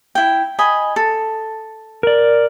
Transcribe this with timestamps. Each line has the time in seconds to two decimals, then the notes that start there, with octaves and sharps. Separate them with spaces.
0.15 E4 G5
0.59 D#5 G#5 B5
0.96 A4
2.03 A#4 D5